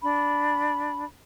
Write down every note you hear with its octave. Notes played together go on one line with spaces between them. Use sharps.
D4 B5